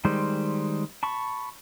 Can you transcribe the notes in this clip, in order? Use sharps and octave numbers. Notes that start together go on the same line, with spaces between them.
D#3 G3 G#3 C5
A5 B5 C#6